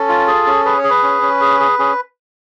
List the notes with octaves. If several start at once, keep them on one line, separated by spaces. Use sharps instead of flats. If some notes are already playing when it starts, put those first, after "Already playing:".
Already playing: C#4 A4
F4
G#4
C#4
G#4 B4
C#5
G#4
B4
C#4
C#4
G#4
G#4
C#4 G#4